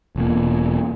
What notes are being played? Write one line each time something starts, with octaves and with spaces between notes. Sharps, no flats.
E1 B2 A#3